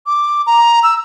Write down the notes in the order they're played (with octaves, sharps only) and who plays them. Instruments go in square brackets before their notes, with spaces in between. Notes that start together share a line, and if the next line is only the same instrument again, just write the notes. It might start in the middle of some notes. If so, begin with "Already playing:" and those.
[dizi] D6
A#5
E6